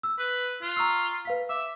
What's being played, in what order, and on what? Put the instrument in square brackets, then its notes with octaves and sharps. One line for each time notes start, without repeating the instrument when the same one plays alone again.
[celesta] E6
[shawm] B4
[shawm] F4 [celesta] F#6
[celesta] A#5 C#6 E6
B4 F5 B6
[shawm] E5 [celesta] D6